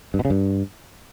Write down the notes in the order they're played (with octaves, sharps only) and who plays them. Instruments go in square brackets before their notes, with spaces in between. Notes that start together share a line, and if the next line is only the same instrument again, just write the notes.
[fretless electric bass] G2
B2
C#3
G2